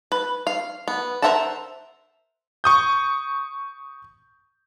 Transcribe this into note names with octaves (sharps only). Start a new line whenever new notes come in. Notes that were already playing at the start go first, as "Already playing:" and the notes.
B4
F5
B3
A#4 C5 E5 F#5 A5
C#6 D#6 G6